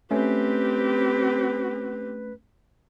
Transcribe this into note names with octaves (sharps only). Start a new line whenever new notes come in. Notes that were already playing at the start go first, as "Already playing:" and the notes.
A3 C4 C#4 G4 B4